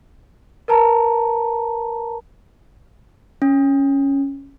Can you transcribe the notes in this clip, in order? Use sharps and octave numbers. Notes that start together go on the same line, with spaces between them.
A#4 B4 A5 A#5
C#4